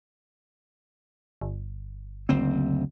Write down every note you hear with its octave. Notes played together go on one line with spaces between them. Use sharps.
G1
F#1 D2 C4